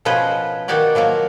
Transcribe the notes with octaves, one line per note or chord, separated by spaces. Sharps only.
B2 F3 C#4 B4 C5 D#5
D#3 D#4 F#4 G4 D5
F3 F#3 A#3 A#4